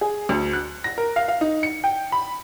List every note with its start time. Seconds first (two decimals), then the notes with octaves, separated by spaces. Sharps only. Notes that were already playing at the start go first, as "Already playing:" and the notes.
0.01 G#4
0.29 D2
0.53 F#6
0.84 A#6
0.98 A#4
1.16 F5
1.28 F5
1.41 D#4
1.63 C#7
1.84 G5
2.12 B5